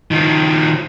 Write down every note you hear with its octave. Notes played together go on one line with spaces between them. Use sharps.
D#3 F3